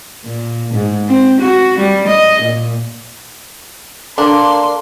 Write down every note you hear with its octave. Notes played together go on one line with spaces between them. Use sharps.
A#2
G#2
C4
F#4
G3
D#5
A#2
A#3 D4 A4 C6